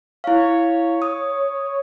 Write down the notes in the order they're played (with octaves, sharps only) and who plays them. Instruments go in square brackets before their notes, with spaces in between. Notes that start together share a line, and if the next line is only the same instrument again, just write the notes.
[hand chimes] E4 F5 [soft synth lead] C#5
[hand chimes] D#6